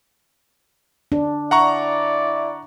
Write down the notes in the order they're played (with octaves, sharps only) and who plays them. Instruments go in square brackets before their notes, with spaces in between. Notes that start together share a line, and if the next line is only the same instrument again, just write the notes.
[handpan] D4
[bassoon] E4 [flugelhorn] D5 [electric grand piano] F#5 A#5 C#6